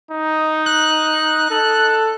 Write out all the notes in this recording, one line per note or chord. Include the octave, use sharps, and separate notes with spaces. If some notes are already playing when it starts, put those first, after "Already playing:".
D#4
F#6
A4